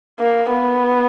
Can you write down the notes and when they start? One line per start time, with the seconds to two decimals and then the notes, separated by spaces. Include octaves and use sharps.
0.19 A#3
0.52 B3